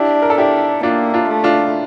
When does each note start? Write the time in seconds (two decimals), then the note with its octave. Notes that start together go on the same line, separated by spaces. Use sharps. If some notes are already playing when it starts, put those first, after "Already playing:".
Already playing: D4 E4 G4
0.22 A#4
0.30 A4
0.37 D4 E4 G4
0.83 A#3 D4 F4
1.14 D4 F4
1.28 A3
1.44 D4 F4